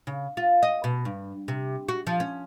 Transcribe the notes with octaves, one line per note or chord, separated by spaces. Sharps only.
C#3
F4
D#5
B2
G2
C3
F#4
F3
C#4